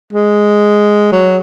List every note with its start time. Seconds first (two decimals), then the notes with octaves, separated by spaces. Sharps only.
0.13 G#3
1.12 F#3